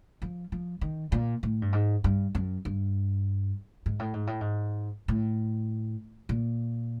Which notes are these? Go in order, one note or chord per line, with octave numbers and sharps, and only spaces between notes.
F3
F3
D#3
A#2
A2
G2
G#2
G2
F#2
G2
G#2
A2
G#2
A2
G#2
A2
A#2